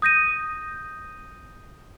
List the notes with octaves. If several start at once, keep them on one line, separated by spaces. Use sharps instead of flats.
D#6 G6 A#6 D#7